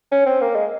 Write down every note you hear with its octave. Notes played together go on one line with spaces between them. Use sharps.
C#4
C4
A#3
G#3